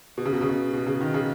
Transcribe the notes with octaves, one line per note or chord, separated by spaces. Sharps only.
B2
C#3
B2
C#3
B2
B2
C#3
D#3
C#3